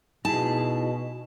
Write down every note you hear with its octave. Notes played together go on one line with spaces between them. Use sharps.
B2 D#4 E4 G#4 A5